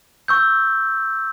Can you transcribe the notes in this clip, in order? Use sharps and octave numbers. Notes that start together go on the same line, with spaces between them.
C#6 E6 G6